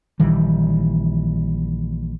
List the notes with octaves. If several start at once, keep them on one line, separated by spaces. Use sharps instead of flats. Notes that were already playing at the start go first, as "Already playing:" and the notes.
A#1 D#3 E3 G3